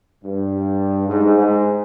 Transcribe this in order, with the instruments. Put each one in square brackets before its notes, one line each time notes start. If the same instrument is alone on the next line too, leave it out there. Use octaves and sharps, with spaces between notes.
[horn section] G2
G#2
G#2